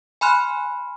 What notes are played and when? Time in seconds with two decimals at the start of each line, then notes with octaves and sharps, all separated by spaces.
0.21 G#5 B5 C6 F6 F#6